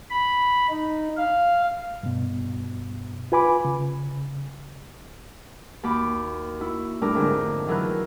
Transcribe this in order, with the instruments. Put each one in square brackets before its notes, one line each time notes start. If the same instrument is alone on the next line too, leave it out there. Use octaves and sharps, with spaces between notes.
[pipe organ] B5
D#4
F5
[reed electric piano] G2 B2
F4 B4 G#5 B5 D6
C#3
[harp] D#2 F#4 B5 D6
E4 F#4
A2 G3 D4 E4 A#4 D6
F2 G#2 D3
D#3 E3 F#3 E4 A#4 F#6